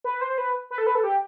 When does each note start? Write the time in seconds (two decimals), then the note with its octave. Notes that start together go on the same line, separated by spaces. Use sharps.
0.04 B4
0.21 C5
0.38 B4
0.71 B4
0.78 A4
0.87 B4
0.95 A4
1.04 G4